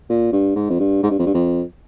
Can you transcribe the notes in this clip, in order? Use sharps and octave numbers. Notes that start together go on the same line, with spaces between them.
A#2
G2
G#2
F2
G2
G#2
G2
F2
G2
F2